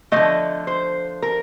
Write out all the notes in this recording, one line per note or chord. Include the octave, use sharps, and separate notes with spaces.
D3 F3 A3 D#5
C5
A#4